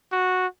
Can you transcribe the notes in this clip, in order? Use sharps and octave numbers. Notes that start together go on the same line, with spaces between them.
F#4